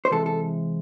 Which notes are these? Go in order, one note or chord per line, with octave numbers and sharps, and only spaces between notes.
C5
C3 E3 G#3 A4
A4